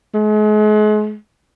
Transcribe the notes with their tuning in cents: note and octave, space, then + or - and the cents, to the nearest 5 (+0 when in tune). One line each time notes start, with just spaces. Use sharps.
G#3 +40